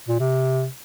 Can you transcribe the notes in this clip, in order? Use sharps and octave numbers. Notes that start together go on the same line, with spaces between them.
A#2
C3